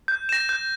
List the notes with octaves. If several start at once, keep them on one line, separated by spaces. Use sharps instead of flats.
G6
A#6 E7
G6